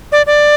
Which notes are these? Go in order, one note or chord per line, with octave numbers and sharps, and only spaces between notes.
D5
D5